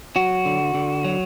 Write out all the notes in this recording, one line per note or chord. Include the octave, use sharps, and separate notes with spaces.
F#3 F#4
D3
D3
F#3